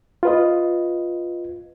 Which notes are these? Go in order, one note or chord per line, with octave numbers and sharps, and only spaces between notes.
F4 B4 D#5